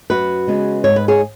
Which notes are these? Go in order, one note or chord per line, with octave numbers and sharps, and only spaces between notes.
F#2 F#4 B4
C#3 G#3 B3
G#2 C#5
B4
G#4 C#5